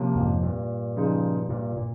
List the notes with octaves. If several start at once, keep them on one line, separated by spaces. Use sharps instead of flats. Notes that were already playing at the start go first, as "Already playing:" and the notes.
Already playing: C3 F3 A#3 C#4 G4
F2 G#2
G2 A#2
C#3 F3 G#3 D#4
G2 A#2
A#2